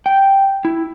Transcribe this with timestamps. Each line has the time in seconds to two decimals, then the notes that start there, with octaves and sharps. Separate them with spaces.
0.06 G5
0.65 E4